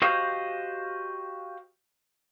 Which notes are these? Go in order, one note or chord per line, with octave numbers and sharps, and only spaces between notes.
F#4 G4 C5 D#5 F5